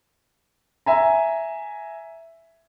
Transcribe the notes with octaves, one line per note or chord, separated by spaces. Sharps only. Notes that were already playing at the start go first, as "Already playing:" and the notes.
E5 G#5 A#5